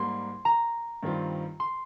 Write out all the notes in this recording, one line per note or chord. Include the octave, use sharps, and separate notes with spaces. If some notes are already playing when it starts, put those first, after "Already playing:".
Already playing: G#2 G3 A#3 C6
A#5
G2 D#3 G3 C4 F4
C6